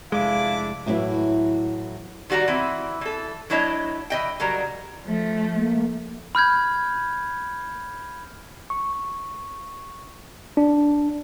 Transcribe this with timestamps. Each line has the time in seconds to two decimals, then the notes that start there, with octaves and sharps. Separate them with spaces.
0.12 F1 G#3 D4 E4 F5 D6
0.86 A2 E3 F#3 E4
2.30 D#3 G3 F#4 B4 A#5
2.48 E3 C4 E4
3.01 E3 A4
3.50 F#3 D4 E4 C#5 D#5
4.10 E3 D#5 G5
4.40 C#3 F#3 G3 A#4 A#5
5.02 F3 A3
5.55 A#3
6.35 B5 F6 G6 G#6
8.70 C#6
10.57 D4